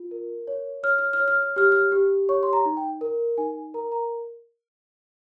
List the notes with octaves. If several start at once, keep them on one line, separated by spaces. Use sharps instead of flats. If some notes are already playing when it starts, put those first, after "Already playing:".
Already playing: F4
A#4
C#5
C#5 F6
F6
F6
C#5
F6
F6
G4 F6
F6
G4
C#5 C#6
C6
A#5
D#4
G5
A#4
D#4 G#5
A#4 A#5
A#5